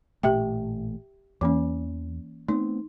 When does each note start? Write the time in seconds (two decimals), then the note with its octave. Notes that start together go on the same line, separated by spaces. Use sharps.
0.23 A1 A#2 A3 G4 E5 G5
1.41 E2 E3 A#3 C#4
2.48 A3 B3 C4 D#4